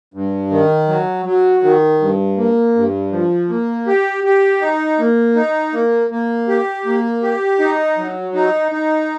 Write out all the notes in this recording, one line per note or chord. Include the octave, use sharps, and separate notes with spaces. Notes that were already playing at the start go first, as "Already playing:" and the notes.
G2
D#3
F#3
F#3
D#3
G2
A#3
G2
F3
A#3
G4
G4
D#4
A#3
D#4
A#3
A#3
G4
A#3
G4
D#4
F#3
D#4
D#4